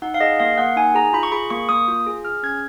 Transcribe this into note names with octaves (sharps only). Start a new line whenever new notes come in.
D#4 F#5
F5
G#4 D#5
A#3 F5
A#3 F#5
D#4 G#5
G#4 A#5
F4 B5
C#6
G#4 B5
A#3 C#6
A#3 D#6
F4
G#4
G#4 F6
C#4 G#6